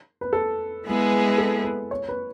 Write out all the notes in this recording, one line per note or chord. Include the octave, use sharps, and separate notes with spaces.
B4
A4
G#3 B3 E4 G#4 B4
A4
B4
C#5
B4